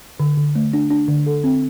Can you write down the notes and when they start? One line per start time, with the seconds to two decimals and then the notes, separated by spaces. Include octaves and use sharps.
0.20 D3
0.37 D3
0.55 A3
0.73 D4
0.90 D4
1.08 D3
1.26 A4
1.44 C4